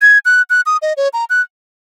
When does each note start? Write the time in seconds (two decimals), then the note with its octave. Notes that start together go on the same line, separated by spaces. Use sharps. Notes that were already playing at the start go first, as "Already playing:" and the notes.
0.02 G#6
0.25 F#6
0.50 F#6
0.66 D#6
0.82 D#5
0.97 C#5
1.13 A#5
1.30 F#6